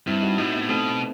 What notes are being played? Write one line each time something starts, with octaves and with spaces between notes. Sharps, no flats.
G2 C4 E4
D#4 F#4
A2 D#4 F#4
B3 D#4
B2 A3 C4